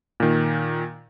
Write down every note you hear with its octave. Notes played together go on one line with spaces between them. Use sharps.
A#2 D#3